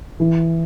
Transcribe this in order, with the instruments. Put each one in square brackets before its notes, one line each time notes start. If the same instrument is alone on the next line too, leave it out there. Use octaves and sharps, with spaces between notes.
[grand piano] E3